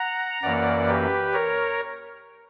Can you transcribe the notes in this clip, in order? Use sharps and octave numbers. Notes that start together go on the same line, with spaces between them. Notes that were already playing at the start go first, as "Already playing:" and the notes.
Already playing: F#5 A#5
F#2 E3 A#3 D5 F#5
G4 B4
A#4 C#5